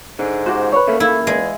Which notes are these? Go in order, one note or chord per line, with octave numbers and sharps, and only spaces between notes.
G#2 D3
C#2 F#4 G4 C5
B4 C#5
C#3 A3 A#3
A3 E4 F5
E2 G#3